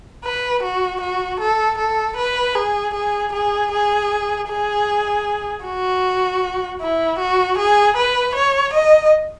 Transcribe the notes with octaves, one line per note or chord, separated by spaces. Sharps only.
B4
F#4
F#4
A4
A4
B4
G#4
G#4
G#4
G#4
G#4
F#4
E4
F#4
G#4
B4
C#5
D#5